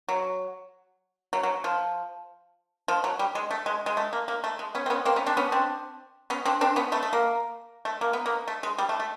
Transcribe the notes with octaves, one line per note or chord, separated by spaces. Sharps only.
F#3
F#3
F#3
F3
F3
F#3
G3
G#3
A3
G#3
G#3
A3
A#3
A#3
A3
G#3
B3 C#4
C4
B3 C#4
A#3 C4
B3 C#4
C4 D4
B3 C#4
C4 D4
B3 C#4
C4 D4
C4 D4
B3 C#4
A3 B3
A3
A#3
A3
A#3
B3
A#3
A3
G#3
G3
A3
A3